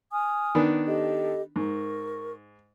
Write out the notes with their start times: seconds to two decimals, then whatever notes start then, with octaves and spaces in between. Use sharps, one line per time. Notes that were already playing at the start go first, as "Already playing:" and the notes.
0.12 G#5 D#6 F6
0.55 D#3 B3 D4
0.87 G4 A4 D#5
1.56 G#2 A#4 C#6